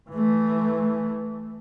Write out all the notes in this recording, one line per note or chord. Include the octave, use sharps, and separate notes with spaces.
E3 A3